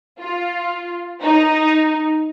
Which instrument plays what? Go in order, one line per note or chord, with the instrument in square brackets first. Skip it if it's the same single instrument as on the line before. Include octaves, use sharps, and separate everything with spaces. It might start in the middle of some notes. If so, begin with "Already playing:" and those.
[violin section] F4
D#4